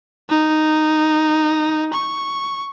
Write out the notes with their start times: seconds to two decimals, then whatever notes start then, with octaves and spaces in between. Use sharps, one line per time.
0.29 D#4
1.94 C#6